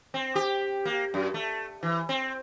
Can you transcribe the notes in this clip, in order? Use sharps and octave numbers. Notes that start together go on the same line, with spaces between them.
C4
G4
A#3
F#2
A3
E3
C4